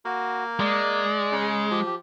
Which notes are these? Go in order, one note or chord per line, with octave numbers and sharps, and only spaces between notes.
A#3 F#4
G#3 D5
C#3
F3 G4
G4